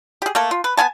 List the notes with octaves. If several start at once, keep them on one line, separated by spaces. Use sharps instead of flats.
G4 G#4
A3 A#3 A4
F4
B4
B3 F4 G#5 A5